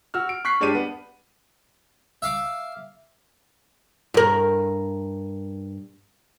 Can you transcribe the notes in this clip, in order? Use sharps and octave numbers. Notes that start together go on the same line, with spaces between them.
F#4 E6 F6
D7
C#6 F#6 B6 C7
G2 G#3 D4 G4 D6 D#7
B3
E5 F5 D6
G2 A#4